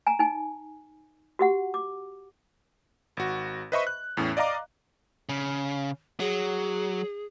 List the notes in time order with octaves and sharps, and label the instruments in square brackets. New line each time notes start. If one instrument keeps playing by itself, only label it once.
[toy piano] G#5 A#5
D#4 G#5
F#4 G4 F#5
D6
[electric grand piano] G#1 F#4
B4 C5 D#5 E5 B5 C#6
F#6
E2 A2 C#4
D5 D#5 F5 A#5 D6
[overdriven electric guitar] C#3
[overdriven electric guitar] F#3 [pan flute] G#4